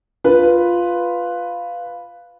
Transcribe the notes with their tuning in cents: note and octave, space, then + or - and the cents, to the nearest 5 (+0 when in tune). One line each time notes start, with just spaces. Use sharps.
F4 +0 B4 +0